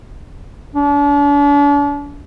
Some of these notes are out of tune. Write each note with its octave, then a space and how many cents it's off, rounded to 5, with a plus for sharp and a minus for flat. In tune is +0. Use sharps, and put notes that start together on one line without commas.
D4 -40